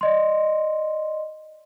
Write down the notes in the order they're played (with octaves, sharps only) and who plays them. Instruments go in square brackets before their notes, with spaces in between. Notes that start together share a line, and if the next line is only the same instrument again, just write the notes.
[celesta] D5 D#5 C6